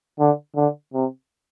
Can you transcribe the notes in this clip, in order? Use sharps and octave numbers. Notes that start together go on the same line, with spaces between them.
D3
D3
C3